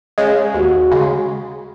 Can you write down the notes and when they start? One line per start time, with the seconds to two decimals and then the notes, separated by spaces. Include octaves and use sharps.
0.18 C#3 G#3
0.54 D#2 F#4
0.91 C#3 G#3